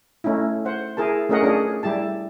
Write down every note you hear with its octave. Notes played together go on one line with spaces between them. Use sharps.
A3 C#4 D#4 E4
C5 F#5
E4 G#4 A#4 A5
A3 C#4 G#4 A#4 D#5 F#5
C#4 D4 F4 G#4
G3 E4 G4 A5